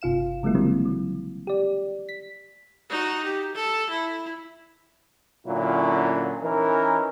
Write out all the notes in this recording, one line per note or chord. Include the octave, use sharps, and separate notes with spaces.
G1 C3 F4 F5 E7
C#3 F#3 G#3 A#3 E4
D3 E3 F#3 G3 A#3 C4
F#3
G4 D5
B6
D#4 F#4
G4
A4
E4
A#2 D3 F#3 C#4 E4 F4
E3 C#4 D#4 A#4